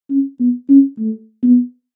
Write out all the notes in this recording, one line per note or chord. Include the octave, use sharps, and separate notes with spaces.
C#4
B3
C#4
A3
B3